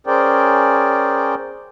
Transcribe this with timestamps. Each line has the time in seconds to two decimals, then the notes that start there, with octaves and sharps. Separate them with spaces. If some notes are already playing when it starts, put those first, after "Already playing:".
0.07 C#4 G#4 A#4 C5 D5 G5